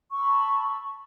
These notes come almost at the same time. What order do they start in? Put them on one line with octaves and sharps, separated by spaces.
C#6 E6 B5 A5